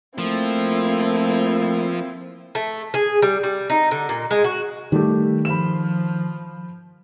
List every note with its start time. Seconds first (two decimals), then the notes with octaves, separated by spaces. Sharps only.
0.18 F3 A3 A#3 C4 E4
2.55 A3
2.94 G#4
3.22 G3
3.43 G3
3.70 D#4
3.91 D3
4.09 A#2
4.31 G#3
4.44 F#4
4.92 D#3 G3 A3 G4
5.45 F3 B5 E7